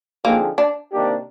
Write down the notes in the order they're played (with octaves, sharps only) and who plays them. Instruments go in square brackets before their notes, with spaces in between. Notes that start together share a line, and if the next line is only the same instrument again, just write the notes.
[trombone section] D3 F3 C4 D#4 G#4 [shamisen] A#3
[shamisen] D4
[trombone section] C3 D#3 A#3 D4 G4